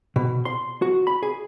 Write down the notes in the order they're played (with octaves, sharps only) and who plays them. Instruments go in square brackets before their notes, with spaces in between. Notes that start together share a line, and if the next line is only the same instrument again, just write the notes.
[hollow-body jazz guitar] B2
C6
F#4
B5
G#4